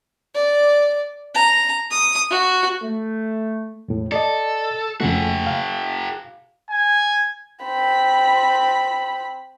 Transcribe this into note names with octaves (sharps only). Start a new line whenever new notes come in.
D5
A#5
D#6
F#4
A3
E2 A2
A4 D5 D#5
F2 C#3 A3 F#4 G#4
F5
G#5
C4 B5